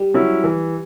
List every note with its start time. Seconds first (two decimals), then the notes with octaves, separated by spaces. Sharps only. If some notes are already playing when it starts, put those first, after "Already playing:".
Already playing: G3
0.14 F#3 C#4 E4
0.44 E3